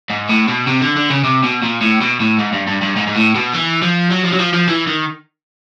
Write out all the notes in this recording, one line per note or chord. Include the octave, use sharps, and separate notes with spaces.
G#2
A2
B2
C3
D3
D3
C#3
C3
B2
A#2
A2
B2
A2
G#2
G2
G2
G2
G#2
G#2
A2
B2
E3
F3
F#3
F3
F#3
F3
F3
E3
D#3